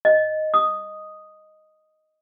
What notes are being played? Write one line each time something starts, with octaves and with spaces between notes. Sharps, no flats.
D#5
D#6